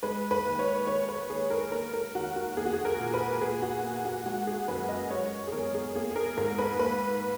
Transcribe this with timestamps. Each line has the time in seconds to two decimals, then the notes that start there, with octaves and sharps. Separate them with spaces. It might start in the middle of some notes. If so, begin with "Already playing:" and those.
0.03 G#3 B4
0.31 B4
0.45 D#2
0.59 C#5
0.87 G#3 C#5
1.09 B4
1.30 D#2 G#4
1.50 A#4
1.72 A#3 A#4
1.94 A#4
2.15 D#2 F#4
2.36 F#4
2.56 A#3 G#4
2.65 F#4
2.73 G#4
2.85 A#4
3.00 A#2
3.14 B4
3.41 A#2 G#4
3.62 F#4
3.83 A#3
4.05 F#4
4.26 G#3 F#4
4.47 G#4
4.68 F#2 B4
4.89 D#5
5.10 G#3 C#5
5.48 G#4
5.52 E2 A#4
5.74 G#4
5.95 A#3 G#4
6.11 G#4
6.16 A#4
6.37 G#2 A#4
6.58 B4
6.79 A#3 B4